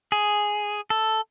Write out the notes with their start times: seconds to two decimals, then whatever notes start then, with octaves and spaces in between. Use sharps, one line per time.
0.12 G#4
0.90 A4